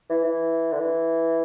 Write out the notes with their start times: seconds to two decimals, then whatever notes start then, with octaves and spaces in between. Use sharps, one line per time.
0.09 E3
0.24 E3
0.73 D3
0.79 E3